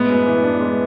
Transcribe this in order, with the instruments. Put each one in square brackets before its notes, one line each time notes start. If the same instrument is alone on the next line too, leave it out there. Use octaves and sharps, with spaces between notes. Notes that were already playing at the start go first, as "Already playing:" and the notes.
Already playing: [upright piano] A2 G#3 [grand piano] B3
[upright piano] F#2
E3
D4
G#3